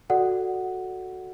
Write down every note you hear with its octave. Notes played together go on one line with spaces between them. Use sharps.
F#4 A4 D5 F#5